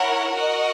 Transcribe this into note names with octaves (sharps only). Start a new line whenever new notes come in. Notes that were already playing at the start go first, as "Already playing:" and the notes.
Already playing: E4 A#4 C#5 F#5
F#4 A#4 D#5 F#5